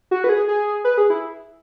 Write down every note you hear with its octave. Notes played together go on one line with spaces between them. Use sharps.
F#4
B4
G#4
G#4
B4
G#4
E4